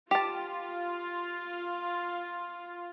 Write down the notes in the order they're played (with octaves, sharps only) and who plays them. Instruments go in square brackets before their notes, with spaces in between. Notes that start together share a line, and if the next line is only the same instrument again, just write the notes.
[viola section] F4 [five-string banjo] G4 A5